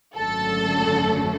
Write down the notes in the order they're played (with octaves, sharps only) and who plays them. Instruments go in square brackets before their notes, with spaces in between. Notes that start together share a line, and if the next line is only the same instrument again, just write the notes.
[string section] G#1 F#2 D3 F#3 A3 A4